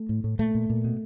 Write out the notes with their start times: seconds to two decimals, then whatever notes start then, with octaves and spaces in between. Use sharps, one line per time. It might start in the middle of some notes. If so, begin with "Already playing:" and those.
Already playing: A3
0.09 A2
0.24 A2
0.39 A#2 A3
0.55 A#2
0.70 A#2
0.84 B2